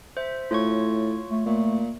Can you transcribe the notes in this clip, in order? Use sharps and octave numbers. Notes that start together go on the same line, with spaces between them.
C5 E5
A2 F4 C#5 C#6
A3
A#2 A3